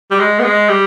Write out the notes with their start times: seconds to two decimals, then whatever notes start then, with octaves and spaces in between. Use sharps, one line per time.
0.11 G3
0.20 G#3
0.39 B3
0.44 G#3
0.69 G3